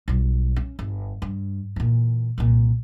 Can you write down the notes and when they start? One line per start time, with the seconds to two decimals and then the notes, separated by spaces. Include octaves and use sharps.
0.08 B1 G3
0.56 C#4
0.79 G1
1.22 G2
1.76 A#2 E3
2.38 C2 A#2